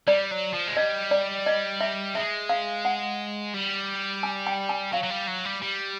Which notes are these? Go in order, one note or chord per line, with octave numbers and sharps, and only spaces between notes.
G3 D5
F#3
F3
G#3
G3 D#5
D5
D#5
E5
G#3 E5
F5
F#5
G3
G#5
G5
G#5
F#3 F5
F#3
G3
F#3
G3
G3